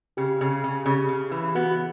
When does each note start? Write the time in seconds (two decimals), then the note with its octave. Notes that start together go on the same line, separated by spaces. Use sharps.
0.17 C#3 G4
0.41 C#3
0.64 C#3
0.86 C#3
1.09 C#3
1.31 E3
1.55 B3 F#4